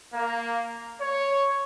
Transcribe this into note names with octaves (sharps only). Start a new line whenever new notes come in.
A#3
C#5